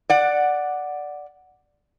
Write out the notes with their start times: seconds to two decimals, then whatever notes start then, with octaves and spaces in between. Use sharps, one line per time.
0.10 D5 F#5